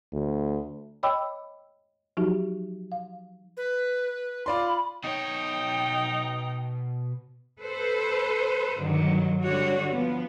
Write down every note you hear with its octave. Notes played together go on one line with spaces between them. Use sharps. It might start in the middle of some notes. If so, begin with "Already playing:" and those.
D2
C#5 D#5 G5 B5 D6 E6
F3 F#3 D#4 F#4 G4
F5
B4
F4 D5 B5 C6
B2 D#4 C#5 G5
A4 B4 C5
G2 D3 D#3 F#3
D3 G3 D4 F#4 C#5
F3 B3